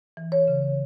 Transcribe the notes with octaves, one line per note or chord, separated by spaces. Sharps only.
E3
C#5
C#3